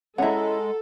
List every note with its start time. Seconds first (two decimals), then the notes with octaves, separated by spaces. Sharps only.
0.18 G#3 C#4 E4 A4 F#5 A#5